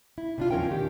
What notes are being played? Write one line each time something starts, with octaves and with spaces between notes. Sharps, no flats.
E4
C3 D4 F4
E2 F3 C#4 A#4 C5 G5
A#2 D#3 G4